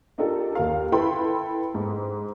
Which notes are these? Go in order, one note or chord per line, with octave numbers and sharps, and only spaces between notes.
D4 D#4 F4 G4 A4 A#4
D#2 A#4 F5
E4 A4 B4 G5 B5 C6
G#2